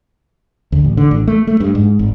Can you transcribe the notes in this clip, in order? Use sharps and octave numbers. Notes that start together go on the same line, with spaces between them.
D2
A1
D3
A1
A3
A3
G2
G#2
G#1